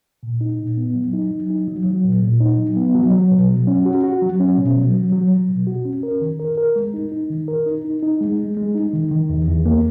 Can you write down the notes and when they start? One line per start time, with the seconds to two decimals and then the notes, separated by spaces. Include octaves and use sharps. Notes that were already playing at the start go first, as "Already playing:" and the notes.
0.23 A#2
0.41 D#4
0.59 A#2
0.77 B3
0.95 F#3
1.13 D#4
1.31 F#3
1.50 D#4
1.68 F#3
1.86 F#3
2.04 A#2
2.22 A#2
2.40 D#4
2.58 F#3
2.77 B3
2.95 F#3
3.13 F#3
3.31 B2
3.49 F#3
3.67 C#4
3.86 F#4
4.04 F#4
4.22 F#3
4.40 C#4
4.58 B2
4.76 F#3
4.94 F#3
5.12 F#3
5.30 F#3
5.48 B2
5.67 F#4
5.85 C#4
6.03 A#4
6.21 D#3
6.40 A#4
6.58 A#4
6.76 G#3
6.94 D#4
7.12 D#4
7.30 D#3
7.48 A#4
7.66 D#4
7.84 D#4
8.02 D#4
8.21 G#3
8.39 G#3
8.57 G#3
8.75 D#4
8.93 D#3
9.11 D#3
9.30 E2
9.48 E2
9.66 A#3